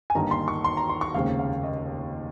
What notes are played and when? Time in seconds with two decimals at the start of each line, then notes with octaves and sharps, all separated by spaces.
0.10 G#5
0.15 G1 G2 D#3 A#3 D#4 A#5
0.31 C6
0.48 C#6
0.64 C6
0.77 A#5
0.89 C6
1.01 C#6
1.14 F1 D#2 C#3 G#3 C4 F5
1.39 F5
1.63 D#5